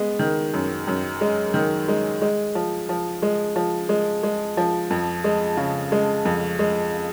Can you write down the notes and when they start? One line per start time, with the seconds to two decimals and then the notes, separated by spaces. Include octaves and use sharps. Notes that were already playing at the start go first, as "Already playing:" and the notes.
Already playing: G#3 B3
0.19 D#3
0.54 F#2
0.88 F#2
1.21 G#3
1.54 D#3
1.88 G#3
2.22 G#3
2.55 F3
2.89 F3
3.22 G#3
3.56 F3
3.89 G#3
4.23 G#3
4.57 F3
4.90 F2
5.24 G#3
5.57 C#3
5.92 G#3
6.25 F2
6.59 G#3